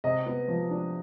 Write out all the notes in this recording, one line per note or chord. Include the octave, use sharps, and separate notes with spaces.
C3 D#5
B3
F3
D4